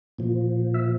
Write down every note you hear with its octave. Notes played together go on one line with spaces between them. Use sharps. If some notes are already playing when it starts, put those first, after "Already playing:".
A#2 F3
E5